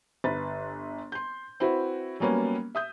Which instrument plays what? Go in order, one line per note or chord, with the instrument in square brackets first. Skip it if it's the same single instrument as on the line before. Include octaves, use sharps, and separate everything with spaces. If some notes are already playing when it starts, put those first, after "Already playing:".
[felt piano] G1 B4 A6
C6 G6
C4 E4 F#4 B4
F#3 G3 A#3 B3 C#4
E5 D#6 G6